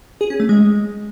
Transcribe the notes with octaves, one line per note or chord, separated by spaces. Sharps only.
G#4
C#4
A3
G#3